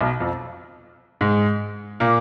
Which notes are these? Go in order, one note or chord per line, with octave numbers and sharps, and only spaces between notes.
B1 B2
F2 F3
G#2 G#3
A#2 A#3